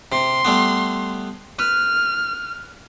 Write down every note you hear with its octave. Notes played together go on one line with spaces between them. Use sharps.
C3 C6
G3 A3 B3
B4 F6